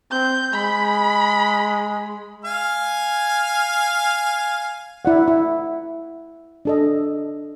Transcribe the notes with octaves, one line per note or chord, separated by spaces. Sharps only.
C4 G6
G#3 B5
F5 G#5 F6
E4 D5 F#5
E4
D4 A4 D#5